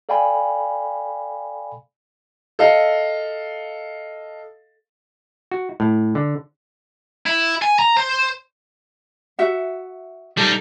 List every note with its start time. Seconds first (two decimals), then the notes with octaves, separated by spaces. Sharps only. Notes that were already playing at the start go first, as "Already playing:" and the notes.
0.09 A4 D5 F5 G5 G#5 B5
2.59 A4 D#5 F5
5.52 F#4
5.80 A2
6.15 D3
7.26 E4
7.62 G#5
7.79 A#5
7.97 C5
9.39 F#4 E5 F#5
10.38 G3 D#4 A4